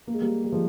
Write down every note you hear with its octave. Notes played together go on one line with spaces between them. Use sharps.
A#3
G#3
G3 A#3
G3
F3 G#3